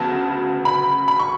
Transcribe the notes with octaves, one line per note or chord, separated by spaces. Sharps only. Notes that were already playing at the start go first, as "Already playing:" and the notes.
Already playing: D2 C#3 F#3 B3 A5
B5
B5
C#6